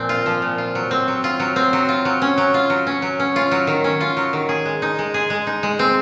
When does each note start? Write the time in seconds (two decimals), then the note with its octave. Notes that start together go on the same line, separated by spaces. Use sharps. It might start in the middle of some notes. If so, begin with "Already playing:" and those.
Already playing: A#2 F3 C4
0.09 F4
0.26 F3
0.42 A#2
0.58 F4
0.75 F#3
0.91 C4
1.08 F#3
1.24 F4
1.40 F#3
1.56 C4
1.73 F#3
1.89 F4
2.05 F#3
2.22 C#4
2.38 F#3
2.54 F4
2.70 F#3
2.87 C#4
3.02 F#3
3.20 C#4
3.36 F4
3.51 F#3
3.67 D#3
3.84 C#4
4.01 F4
4.17 F#3
4.33 D#3
4.49 G#4
4.65 G#3
4.82 D#4
4.99 G#3
5.14 G#4
5.30 G#3
5.47 D#4
5.63 G#3
5.79 C4